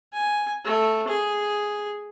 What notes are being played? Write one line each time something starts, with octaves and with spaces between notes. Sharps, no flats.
G#5
A3
G#4